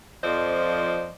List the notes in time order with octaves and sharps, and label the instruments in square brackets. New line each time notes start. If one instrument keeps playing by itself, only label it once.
[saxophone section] F2 F3 C5 D5 D#5